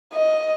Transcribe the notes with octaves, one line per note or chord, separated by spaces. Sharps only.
D#5